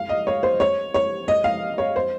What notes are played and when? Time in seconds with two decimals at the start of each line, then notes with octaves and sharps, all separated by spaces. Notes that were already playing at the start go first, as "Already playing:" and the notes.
Already playing: F5
0.09 D#5
0.27 C#5
0.43 C5
0.60 C#5
0.94 C#5
1.28 D#5
1.44 F5
1.78 C#5
1.96 C5